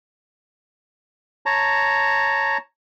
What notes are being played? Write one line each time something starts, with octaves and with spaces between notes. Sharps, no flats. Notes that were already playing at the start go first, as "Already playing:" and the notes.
C#5 A5 A#5